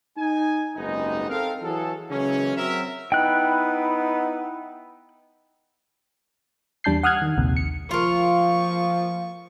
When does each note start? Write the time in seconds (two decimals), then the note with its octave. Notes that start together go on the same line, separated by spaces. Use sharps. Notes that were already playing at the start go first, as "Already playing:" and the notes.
0.17 D#4 G#5
0.76 F#1 C2 G#2 G#3 B3 D#4
1.29 C4 A4 A#4 F5
1.62 E3 F#3 F#4 G#4 A4
2.10 C#3 E3 F#3 G#3 A#3 C#4
2.56 F#3 C4 A#4 E5
3.12 B3 D#4 E4 G5 F#6
6.84 E2 G3 D4 A5 G6 C7
7.03 F#5 D#6 F6 F#6 G#6
7.22 D#3
7.37 A#1 D#2 C3
7.57 C#7
7.91 F3 F4 A#4 C#6